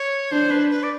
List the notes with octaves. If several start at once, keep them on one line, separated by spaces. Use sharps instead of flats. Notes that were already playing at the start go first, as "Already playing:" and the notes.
Already playing: C#5
D4 C5
B4
B4
D5